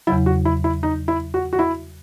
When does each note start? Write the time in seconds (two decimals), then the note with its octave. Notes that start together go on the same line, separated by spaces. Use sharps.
0.07 E2 C#3 F#3 E4
0.26 F#4
0.45 E4
0.64 E4
0.83 D#4
1.08 E4
1.34 F#4
1.53 F#4
1.59 E4